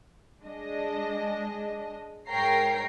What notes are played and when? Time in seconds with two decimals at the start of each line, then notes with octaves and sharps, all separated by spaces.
0.42 G#3 D4 D#5
2.28 G#2 A#4 C#5 G5 A#5 C7